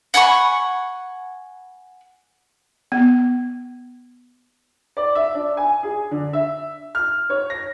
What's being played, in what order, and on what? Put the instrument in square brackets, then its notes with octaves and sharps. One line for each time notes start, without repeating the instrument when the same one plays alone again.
[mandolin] F#5 G#5 B5 C#6
[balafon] B3
[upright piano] D5
E5
D4
G#5
G#4
D3
E5
F6
C#5
A#6